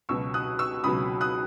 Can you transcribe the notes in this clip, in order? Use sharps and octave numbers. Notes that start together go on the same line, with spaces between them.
C#2 B2 F#3 C#6 E6
D#6 F#6
C#6 E6
C#2 B2 F#3 B5 D#6
D#6 F#6